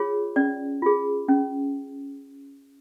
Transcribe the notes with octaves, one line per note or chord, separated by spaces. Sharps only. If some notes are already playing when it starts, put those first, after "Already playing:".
Already playing: F4 G#4 C#5
C#4 D5
F4 G#4
C#4